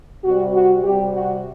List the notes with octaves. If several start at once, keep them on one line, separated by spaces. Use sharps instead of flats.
C3 G3 F#4
F#4
C3 G3 G4
F#4